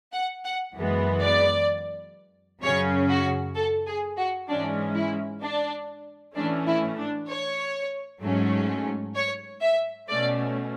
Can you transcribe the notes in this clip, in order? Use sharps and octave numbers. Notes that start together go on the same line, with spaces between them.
F#5
F#5
F#2 E3 G#3 B3
D5
F#2 C#3 F#3 C#4 C#5
F#4
A4
G#4
F#4
G#2 E3 G#3 C#4 D4
E4
D4
A2 E3 A3 C#4 D4
E4
D4
C#5
G#2 F#3 A3 C#4
C#5
E5
B2 A3 C#4 D5